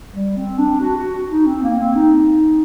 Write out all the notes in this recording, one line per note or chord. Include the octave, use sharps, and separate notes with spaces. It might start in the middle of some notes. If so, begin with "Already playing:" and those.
G3
C4
D4
F#4
F#4
D#4
C4
A#3
C4
D#4